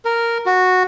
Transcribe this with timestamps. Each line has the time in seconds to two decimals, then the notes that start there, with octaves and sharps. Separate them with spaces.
0.05 A#4
0.46 F#4